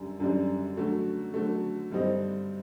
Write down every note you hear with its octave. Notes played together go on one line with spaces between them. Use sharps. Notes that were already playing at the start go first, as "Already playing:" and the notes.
Already playing: F#2 D3 G3 D4
F#2 D3 G3 D4
D3 F#3 A3
D3 F#3 A3
G2 D3 G3 C4 D#4